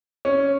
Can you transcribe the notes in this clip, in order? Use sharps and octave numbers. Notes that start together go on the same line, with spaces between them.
C#4